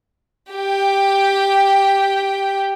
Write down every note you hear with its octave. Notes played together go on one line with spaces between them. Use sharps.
G4 G5